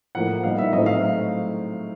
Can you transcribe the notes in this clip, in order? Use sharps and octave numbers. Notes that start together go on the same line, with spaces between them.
A2 F3 A#3 F#5
A#2 G3 B3 D#4 F5
E5
A2 F#3 A3 C4 D#4 D#5
F5